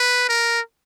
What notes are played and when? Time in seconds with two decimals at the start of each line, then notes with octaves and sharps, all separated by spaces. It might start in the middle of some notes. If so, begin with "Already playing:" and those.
Already playing: B4
0.29 A#4